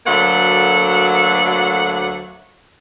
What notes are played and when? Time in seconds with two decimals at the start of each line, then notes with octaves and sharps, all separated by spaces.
0.06 D2 F#3 A3 A#3 F#5